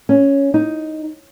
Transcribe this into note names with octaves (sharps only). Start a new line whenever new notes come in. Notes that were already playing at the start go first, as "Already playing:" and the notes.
C#4
D#4